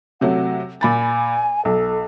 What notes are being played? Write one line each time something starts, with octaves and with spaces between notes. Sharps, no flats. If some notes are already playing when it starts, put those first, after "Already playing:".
C3 F#3 A3 F#5
A#2 G#5 B5 A6
B1 A4